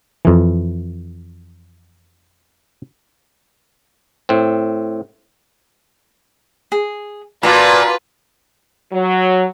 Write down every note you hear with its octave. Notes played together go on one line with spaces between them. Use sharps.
F2 E3
A2 C4
G#4
A#2 F4 F#4 B4 A5 A#5
F#3